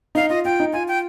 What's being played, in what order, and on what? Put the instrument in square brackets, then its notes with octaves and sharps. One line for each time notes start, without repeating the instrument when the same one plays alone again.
[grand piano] D#4 [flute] F5
[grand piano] F4 [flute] D#5
[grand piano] F4 [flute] G5
[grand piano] D#4
[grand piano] F4 [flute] G#5
[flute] G5